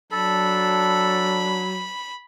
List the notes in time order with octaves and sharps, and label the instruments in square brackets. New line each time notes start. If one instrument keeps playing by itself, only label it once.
[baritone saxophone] F#3 [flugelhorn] D4 [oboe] A4 [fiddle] B5